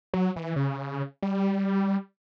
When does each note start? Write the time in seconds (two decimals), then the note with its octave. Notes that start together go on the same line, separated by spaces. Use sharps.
0.14 F#3
0.36 E3
0.56 C#3
1.23 G3